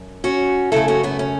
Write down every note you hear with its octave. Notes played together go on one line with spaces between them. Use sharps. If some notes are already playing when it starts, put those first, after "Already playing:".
Already playing: F#2
C#4 F#4
F#2 C#3 A3 E4 A4
C#4 F#4
B3 E4
C#4